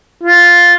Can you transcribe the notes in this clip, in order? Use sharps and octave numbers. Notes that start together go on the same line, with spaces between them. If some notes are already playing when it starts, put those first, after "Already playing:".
F4